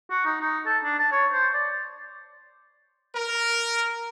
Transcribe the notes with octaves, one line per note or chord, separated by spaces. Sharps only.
F#4
D#4
D#4
A4
D4
A5
C#5
C5
D5
A#4